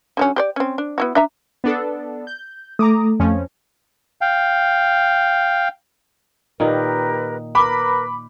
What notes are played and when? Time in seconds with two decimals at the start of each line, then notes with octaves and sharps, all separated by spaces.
0.17 D3 F#3 C#4
0.36 G4 C5 D5
0.56 C4 C#4
0.78 D4
0.98 B3 E4 F#4
1.15 D4 E5 A#5
1.64 B3 D4 A4
2.27 G6
2.79 A3 A#5 D6 D#6
3.20 F2 F3 C#4
4.21 F5 G5
6.60 A#2 D#3 D#4 G4 A#4 B4
7.55 A#4 B4 B5 D6